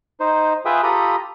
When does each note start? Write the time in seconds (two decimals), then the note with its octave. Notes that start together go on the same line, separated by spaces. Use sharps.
0.20 D#4 C5
0.65 F4 G#4 B4 E5 G5 D#6
0.83 F4 G4 A4 A#5 B5 D#6